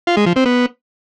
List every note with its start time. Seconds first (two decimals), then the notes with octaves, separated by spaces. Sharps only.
0.07 F4
0.17 G#3
0.26 F3
0.36 C4
0.46 B3